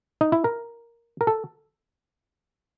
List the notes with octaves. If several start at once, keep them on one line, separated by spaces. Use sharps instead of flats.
D#4
E4
A#4
A#4
A4